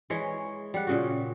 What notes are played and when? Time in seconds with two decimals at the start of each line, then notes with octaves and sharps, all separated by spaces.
0.10 E3 G#3 C#5
0.74 G3 F#5
0.87 A#2 C#3 F#4